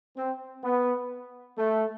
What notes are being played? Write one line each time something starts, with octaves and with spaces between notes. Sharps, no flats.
C4
B3
A3